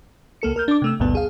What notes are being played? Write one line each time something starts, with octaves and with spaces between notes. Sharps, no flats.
C#2 A#3 A4 C#7
A#4 F6 G6
D4 D6
C3 A3 E6
G#1 D2 G2 B2 B3 A5
G#4 F5